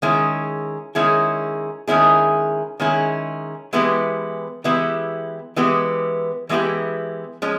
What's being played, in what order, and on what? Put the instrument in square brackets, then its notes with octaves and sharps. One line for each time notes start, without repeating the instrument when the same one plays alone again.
[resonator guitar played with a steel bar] D#3 G#3 C#4 E4 G#4
D#3 G#3 C#4 E4 G#4
D#3 G#3 C#4 E4 G#4
D#3 G#3 C#4 E4 G#4
E3 G#3 B3 E4 G4
E3 G#3 B3 E4 G4
E3 G#3 B3 E4 G4
E3 G#3 B3 E4 G4
F3 G#3 C#4